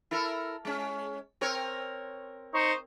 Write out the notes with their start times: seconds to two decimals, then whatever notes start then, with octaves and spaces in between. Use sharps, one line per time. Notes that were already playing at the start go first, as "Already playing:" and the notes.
0.11 E4 A4 A#4
0.65 G#3 C#4
1.41 C4 A#4 C#5
2.54 D#4 C5 C#6